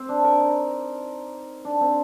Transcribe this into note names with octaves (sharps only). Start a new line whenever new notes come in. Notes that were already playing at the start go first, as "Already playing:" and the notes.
Already playing: C4
D4
A#4
D#4
D4
C4